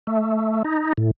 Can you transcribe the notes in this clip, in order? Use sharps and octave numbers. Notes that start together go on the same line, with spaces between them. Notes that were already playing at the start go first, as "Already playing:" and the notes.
A3
D#4
A2